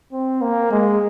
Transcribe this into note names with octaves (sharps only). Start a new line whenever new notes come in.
C4
A#3
G#3